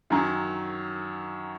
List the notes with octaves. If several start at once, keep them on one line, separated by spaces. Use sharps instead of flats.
F#2 D#3 F#3